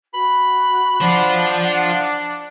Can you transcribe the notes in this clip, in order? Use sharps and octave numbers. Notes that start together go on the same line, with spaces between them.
F#4 B5
D4 F4 C5 F#5